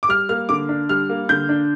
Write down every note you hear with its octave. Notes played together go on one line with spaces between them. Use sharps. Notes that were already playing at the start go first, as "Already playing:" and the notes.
D6
G3 F6
A#3 F6
D3 D6
D4
G3 F6
A#3
D3 G6
D4